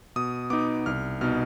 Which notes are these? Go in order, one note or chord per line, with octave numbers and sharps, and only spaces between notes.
B2 D#6
B3 D#4 D6
C2 F6
B2 B3 D#4 F6